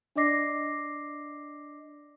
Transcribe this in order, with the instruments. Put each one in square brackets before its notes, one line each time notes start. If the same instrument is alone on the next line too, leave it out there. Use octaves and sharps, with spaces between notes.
[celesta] D4 D5 D#5 D6 A#6 C7